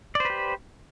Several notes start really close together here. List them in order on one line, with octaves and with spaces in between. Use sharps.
D5 C5 B4 G4